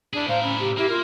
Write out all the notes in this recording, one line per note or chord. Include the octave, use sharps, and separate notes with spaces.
D4 E4 G#4
A2 A#4 C5 F5
C#4 B5
G4
A#3 E4 G4
F4 A#4